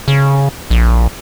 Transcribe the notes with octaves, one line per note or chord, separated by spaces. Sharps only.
C#3
A#1